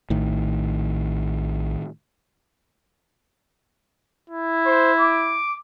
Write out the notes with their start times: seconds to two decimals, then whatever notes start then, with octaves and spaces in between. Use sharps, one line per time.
0.10 A#1 A2 D#3
4.30 E4
4.66 C5
5.00 D6